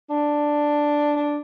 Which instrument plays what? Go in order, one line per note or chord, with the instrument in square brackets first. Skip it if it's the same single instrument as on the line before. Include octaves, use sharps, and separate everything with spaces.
[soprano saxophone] D4
D4